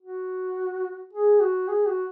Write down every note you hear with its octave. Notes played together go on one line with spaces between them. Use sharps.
F#4
G#4
F#4
G#4
F#4